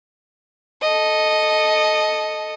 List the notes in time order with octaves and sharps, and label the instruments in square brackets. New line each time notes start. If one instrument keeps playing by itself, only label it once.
[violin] A4 D#5